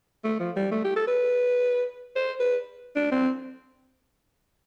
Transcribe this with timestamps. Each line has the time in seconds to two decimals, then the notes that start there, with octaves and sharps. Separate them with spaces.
0.24 A3
0.40 F3
0.56 G3
0.71 A3
0.84 G4
0.96 A4
1.07 B4
2.16 C5
2.40 B4
2.96 D4
3.12 C4